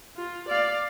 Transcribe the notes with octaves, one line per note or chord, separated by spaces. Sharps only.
F4
D5 F5